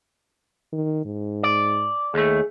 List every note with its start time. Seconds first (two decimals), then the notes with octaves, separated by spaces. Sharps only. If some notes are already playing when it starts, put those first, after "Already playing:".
0.73 D#3
1.05 G#2
1.43 D5
2.14 D#2 A3 G#4